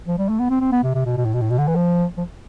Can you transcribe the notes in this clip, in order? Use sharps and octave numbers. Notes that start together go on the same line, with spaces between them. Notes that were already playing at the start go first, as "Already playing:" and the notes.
F3
G3
A3
B3
C4
C4
B3
C3
C3
B2
B2
A2
B2
A2
B2
D3
E3
F3
F3